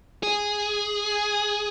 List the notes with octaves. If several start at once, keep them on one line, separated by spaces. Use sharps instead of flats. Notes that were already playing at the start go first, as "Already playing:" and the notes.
G#4